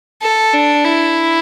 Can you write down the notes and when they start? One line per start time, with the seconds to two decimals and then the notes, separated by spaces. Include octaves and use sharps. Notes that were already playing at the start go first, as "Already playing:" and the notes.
0.22 A4
0.53 D4
0.85 E4